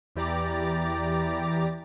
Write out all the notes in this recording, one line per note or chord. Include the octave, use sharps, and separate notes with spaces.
E2 E3 G4 D5 A#5 A6